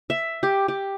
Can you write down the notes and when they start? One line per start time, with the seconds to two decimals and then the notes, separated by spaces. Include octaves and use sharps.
0.10 E5
0.43 G4
0.68 G4